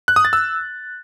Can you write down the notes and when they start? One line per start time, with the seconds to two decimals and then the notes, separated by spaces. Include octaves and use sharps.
0.08 F#6
0.16 D#6
0.25 A6
0.33 E6